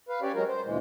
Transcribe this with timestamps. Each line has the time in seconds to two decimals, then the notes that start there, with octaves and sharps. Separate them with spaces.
0.09 B4 F5
0.22 C#4 G4 C#5 D5
0.34 F#3 G#3 C#4 F#4 A#4
0.47 C5
0.64 D2 A#2 E3 G#3